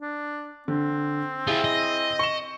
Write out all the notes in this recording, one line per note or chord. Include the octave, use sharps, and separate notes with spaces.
D4
D3 C4
E4 F4 G4 G#4
D#5
C#6 E7